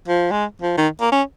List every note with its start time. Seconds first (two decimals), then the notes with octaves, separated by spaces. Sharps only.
0.08 F3
0.31 G#3
0.62 F3
0.77 D#3
1.01 A#3
1.12 C#4